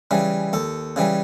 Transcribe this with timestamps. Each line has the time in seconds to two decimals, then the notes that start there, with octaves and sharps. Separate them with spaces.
0.11 C#3 E3 G3
0.53 D#2 A4
0.96 C#3 E3 G3